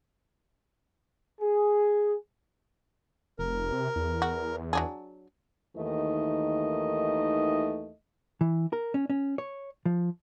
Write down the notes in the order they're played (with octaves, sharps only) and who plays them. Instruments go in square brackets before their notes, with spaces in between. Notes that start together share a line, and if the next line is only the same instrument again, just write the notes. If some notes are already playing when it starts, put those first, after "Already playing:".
[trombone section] G#4
[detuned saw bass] F1 [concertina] A#4
[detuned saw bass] C3
E2
[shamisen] F#4
F#3 D4 G#4
[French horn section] D#2 D#3 E3 A3 D#4 D#5
[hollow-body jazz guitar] E3
A#4
C#4
C#4
C#5
F3